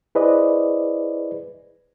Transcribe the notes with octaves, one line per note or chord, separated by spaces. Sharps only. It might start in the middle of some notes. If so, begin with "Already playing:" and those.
E4 G#4 B4 C5 D5 D#5